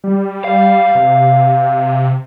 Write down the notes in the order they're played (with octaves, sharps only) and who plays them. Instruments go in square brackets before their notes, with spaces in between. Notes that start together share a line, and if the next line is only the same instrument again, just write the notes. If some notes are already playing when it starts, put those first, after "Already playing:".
[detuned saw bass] G3
[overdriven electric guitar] F5
[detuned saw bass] C3